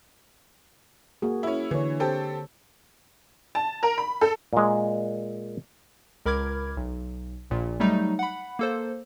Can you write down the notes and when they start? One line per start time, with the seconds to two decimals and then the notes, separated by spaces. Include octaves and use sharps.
1.22 A#3 F#4 G#4
1.43 C#4 E4
1.71 D3 E3 C#5
2.00 C4 G4 A4
3.55 A5
3.83 A#4
3.98 B5
4.21 A4
4.53 A#2 G#3
6.26 C#2 A#4 B5 D6 F6 G#6
6.77 B1
7.50 A#1 A#2
7.80 F#3 G3 A3 D#4
8.19 F#5 B5
8.59 A#3 A4 C5